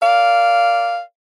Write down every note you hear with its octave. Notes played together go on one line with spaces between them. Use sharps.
A#4 D5 F5